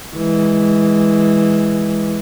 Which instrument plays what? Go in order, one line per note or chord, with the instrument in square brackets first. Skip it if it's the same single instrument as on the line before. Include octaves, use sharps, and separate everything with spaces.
[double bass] E3 G#3